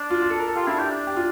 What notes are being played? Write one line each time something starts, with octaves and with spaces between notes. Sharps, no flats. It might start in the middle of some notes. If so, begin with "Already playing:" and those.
Already playing: D4
F4
F4
A4
A#4
A4
F4 G4
D4 E4
E4 G4
D4
G4
F4